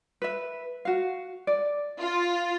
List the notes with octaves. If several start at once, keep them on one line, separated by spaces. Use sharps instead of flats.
B4 E5
F#4 F5
D5
F4